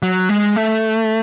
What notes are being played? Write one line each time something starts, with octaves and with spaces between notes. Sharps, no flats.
F#3
G#3
A3